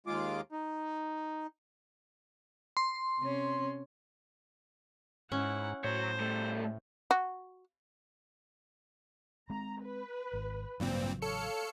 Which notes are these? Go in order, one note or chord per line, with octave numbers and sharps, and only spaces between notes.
D#2 G#3 F4 D6
D#4
C6
C3 C#4
G#2 C#4 E4 F#5
A2 F#3 C5 C#5
G3 A3
F#4
G#3 C4 A#5
B4
G#1
A1 G2 A#2 C#3 F#3 C4
A4 C#5 F5 C#7